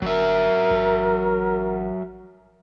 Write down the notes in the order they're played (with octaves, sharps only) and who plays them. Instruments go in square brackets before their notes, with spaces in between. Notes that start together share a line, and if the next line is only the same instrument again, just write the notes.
[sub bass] G1 [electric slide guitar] F#3 E5 [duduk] A#4
[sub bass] A1